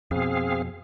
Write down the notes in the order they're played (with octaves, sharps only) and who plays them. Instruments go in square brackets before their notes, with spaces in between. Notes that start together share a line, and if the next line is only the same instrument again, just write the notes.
[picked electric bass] F2 B2 [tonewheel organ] C4 G#4 F5